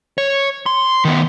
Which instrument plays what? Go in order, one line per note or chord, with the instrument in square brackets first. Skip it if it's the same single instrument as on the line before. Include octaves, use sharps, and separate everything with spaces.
[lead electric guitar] C#5
C6
D#3 B3